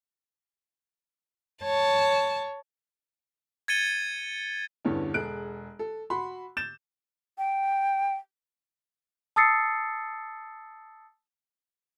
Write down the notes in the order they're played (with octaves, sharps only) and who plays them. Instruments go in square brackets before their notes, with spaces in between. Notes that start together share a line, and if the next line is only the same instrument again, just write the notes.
[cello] C#5 [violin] A5
[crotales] G#6 A6 C#7 D#7 G7
[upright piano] E2 G2 D3 E3 C#4
E1 G#4 A4 F#6 D7
A4
F#4 B5 C6
G6 A6 E7
[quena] G5
[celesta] A5 D#6 E6 A6 C7 C#7